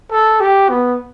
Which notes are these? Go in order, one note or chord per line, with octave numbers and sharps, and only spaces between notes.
A4
G4
B3